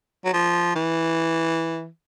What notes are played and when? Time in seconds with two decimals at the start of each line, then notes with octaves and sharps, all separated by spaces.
0.25 F#3
0.33 F3
0.75 E3